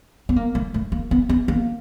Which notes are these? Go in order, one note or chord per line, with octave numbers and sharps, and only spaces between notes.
B3
A#3
A3
A3
A#3
B3
B3
A#3